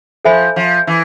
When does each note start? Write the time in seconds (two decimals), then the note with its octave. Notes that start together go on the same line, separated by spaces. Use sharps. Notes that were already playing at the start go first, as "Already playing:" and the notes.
0.25 F3 A4 C5 E5 G#5 B5
0.56 F3
0.87 E3